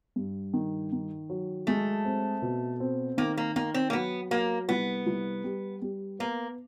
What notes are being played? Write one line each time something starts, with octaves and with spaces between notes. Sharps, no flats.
G2
D#3
D#3
F#3
G#3 A3
C4
B2
C4
D#3 A#3
A#3
D#3 A#3
C4
A#3
F#3 B3
F#3 A#3
C2 B3
C2
G3
G3
A#3 B3